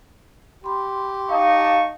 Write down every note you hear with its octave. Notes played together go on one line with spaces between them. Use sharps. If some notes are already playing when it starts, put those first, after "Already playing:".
G4 B5 C6
D#4 F5 A5 C#6